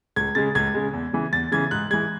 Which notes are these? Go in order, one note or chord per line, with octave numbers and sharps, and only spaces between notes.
C#2 G#6
C#3 G#3 A6
C#2 G#6
C#3 G#3
E2
C#3 E3
E2 A6
C#3 E3 G#6
G#2 F#6
E3 G#3 G#6